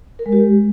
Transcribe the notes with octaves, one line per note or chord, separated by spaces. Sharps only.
A#4
G#3
G4
G#3